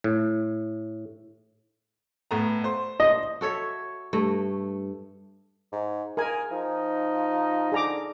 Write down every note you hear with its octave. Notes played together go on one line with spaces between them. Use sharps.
A2
A2 B3 A#5
C5
D#5
F#4 A4 C#5 E5
G2 A3
G#2
G#4 A#4 G#5
F3 D#4
D3 G#4 A#5 D6